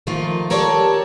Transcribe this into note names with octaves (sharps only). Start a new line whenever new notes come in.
D#3 F3 A3 A#3 F4
G4 A4 A#4 C#5 D5 A5